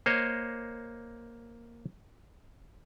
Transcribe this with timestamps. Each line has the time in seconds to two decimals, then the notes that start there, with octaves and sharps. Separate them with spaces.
0.06 A#3 C5 C#5 D#5